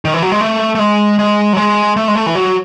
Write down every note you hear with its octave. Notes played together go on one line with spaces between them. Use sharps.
D#3
E3
F#3
G#3
A3
A3
G#3
G#3
F#3
G#3
A3
G#3
A3
E3
F#3